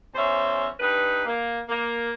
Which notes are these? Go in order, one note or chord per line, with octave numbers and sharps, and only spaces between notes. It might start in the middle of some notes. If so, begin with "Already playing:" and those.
E2 C#4 C5 E5
G2 D#4 B4
A#3
A#3